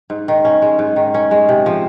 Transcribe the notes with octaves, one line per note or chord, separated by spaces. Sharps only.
G#2
D#3
C#4
G#3
G#2
D#3
C#4
G#3
C3
F3